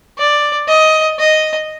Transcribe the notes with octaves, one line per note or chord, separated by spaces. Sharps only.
D5
D#5
D#5